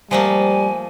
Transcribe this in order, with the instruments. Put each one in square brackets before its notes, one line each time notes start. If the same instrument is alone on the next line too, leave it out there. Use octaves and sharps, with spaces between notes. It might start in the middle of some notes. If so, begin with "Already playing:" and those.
[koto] F3 A3 A#3 [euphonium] G3 [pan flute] G#5